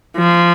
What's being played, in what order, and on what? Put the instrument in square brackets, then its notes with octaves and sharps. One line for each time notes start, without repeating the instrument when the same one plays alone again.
[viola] F3